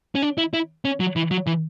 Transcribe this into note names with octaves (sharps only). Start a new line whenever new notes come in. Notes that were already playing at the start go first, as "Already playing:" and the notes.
C#4
D4
E4
E4
C#4
F#3
E3
F#3
E3